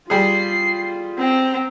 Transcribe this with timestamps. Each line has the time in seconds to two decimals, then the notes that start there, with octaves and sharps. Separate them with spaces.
0.10 G3 F4 G#4 C7
1.18 C4 A#5